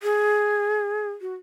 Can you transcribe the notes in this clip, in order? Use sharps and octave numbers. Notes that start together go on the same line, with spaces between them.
G#4
F#4